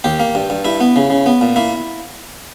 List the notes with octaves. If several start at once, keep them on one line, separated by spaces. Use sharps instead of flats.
D#2 G4
A#3
G2
G2
G2 E4
B3
C#3
C#3
B3
A#2
A#3 E4